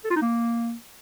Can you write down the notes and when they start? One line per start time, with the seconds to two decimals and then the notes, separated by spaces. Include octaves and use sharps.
0.04 A4
0.10 F4
0.16 D#4
0.22 A#3